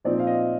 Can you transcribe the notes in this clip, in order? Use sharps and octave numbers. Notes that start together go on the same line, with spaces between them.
A#2 F3 C4 D#4 D5
F5
D#5